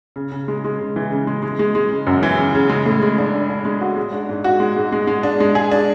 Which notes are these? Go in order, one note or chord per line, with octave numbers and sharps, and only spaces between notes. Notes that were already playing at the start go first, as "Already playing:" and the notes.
C#3
C#3
G#3
G#3
C#3
E3
C#3
G#3
G#3
G#3
G#3
C#3
F#2
E3
C#3
C#3
G#3
A2
G#3
D4
D4
D4
G#3
F#4
G#3
D4
G#2
F#4
G#3
G#2
G#3
G#3
D4
G#3
G#4
D4